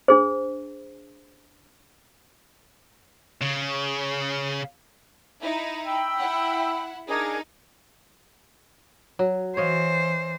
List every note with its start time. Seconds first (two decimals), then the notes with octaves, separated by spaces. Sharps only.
0.08 D4 G#4 C5
3.42 C#3
5.41 D#4 E4
5.84 G5 B5 E6
6.17 E4 F#5
7.08 D4 D#4 G#4 A#4
9.19 F#3
9.57 E3 C5 C#5 D#5 F5